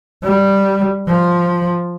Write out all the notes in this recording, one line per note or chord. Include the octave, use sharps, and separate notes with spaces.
G3
F3